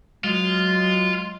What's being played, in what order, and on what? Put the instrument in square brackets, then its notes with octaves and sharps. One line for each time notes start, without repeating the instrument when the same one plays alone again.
[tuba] F#3 [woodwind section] G#3 [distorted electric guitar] F4